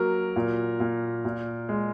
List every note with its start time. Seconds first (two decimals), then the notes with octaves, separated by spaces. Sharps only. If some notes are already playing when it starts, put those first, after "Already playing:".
Already playing: F#3 A#3 A#4
0.36 A#2
0.80 A#2
1.25 A#2
1.69 G#3